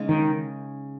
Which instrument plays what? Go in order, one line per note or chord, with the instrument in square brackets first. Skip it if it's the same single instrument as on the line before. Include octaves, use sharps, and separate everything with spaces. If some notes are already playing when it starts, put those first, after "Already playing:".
Already playing: [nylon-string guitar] C#3 G#3 D#4
[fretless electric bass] D#3